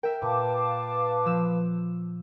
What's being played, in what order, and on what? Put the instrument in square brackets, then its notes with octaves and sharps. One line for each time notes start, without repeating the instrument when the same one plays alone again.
[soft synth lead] A#4 [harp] E5 G5
[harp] A#2 [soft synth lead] B4 [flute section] F5 A5 D6
[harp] F3 E6 E7